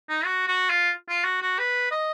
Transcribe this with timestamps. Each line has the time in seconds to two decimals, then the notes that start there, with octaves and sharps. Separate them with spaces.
0.09 D#4
0.25 F#4
0.48 F#4
0.70 F4
1.09 F4
1.25 F#4
1.42 F#4
1.59 B4
1.91 D#5